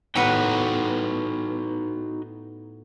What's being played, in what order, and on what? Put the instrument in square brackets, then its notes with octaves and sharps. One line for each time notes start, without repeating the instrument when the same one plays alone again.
[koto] A2 B3 B4 [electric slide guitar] D#4 F#4 G5